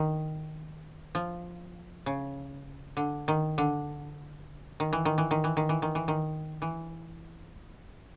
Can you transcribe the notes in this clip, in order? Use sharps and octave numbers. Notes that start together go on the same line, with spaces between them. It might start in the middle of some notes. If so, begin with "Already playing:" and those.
Already playing: D#3
F3
C#3
D3
D#3
D3
D#3
E3
D#3
E3
D#3
E3
D#3
E3
D#3
E3
D#3
E3